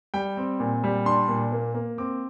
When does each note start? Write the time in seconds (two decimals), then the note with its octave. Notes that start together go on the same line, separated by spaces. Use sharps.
0.14 G3 G5
0.37 C4
0.60 A#2
0.84 G3
1.05 D4 C6
1.28 A#2
1.52 A#3
1.74 A#3
1.98 C4 D6